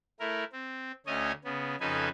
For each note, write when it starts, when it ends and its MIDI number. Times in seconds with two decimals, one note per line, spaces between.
0.20 0.44 57
0.20 0.44 64
0.20 0.44 70
0.53 0.92 60
1.07 1.32 38
1.07 1.32 57
1.07 1.32 61
1.07 1.32 73
1.07 1.32 75
1.07 1.32 80
1.44 1.75 49
1.44 1.75 59
1.80 2.09 41
1.80 2.09 49
1.80 2.09 63
1.80 2.09 69
1.80 2.09 71
1.80 2.09 80